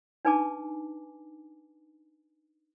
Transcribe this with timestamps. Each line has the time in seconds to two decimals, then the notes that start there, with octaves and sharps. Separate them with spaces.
0.25 D4 D#4 B4 G#5 A5 D6